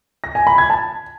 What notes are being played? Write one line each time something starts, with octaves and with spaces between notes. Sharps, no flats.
A#6
G#5
B5
G#6
A5